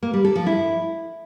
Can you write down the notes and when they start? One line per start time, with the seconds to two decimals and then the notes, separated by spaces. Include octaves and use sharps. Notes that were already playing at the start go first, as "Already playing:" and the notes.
0.03 A#3
0.14 G3
0.25 A4
0.36 F3
0.46 E4